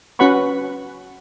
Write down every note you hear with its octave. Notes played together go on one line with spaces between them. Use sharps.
C#4 F#4 B4 F#5 B5 C#6